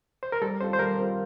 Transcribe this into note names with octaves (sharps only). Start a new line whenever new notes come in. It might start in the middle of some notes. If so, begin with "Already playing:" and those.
C5
A#4
G3 A4
C4 F4 A4 C5
C5
G3 A#4
C4 F4 A4